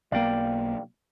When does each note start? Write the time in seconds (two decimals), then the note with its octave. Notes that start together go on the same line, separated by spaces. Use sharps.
0.12 B1 A#3 D5 F5 G5